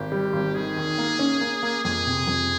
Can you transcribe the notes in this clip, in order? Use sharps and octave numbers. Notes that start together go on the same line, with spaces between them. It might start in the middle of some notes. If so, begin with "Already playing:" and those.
Already playing: G#1 G4
G3
G#1
D#3 G#4
D#2
A#3
C#4
A#3
A#3
F2 G#4
C3
F2